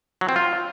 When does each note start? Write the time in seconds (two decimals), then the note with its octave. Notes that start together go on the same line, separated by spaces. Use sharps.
0.21 F#3
0.29 C4
0.36 F4